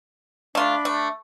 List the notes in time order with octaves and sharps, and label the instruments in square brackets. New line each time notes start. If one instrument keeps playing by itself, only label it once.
[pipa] A3 F4 [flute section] D4 B5
[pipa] A3